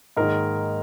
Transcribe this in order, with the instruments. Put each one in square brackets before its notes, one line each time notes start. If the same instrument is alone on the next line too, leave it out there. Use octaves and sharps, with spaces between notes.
[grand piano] G#2 D#3 A#3 A#4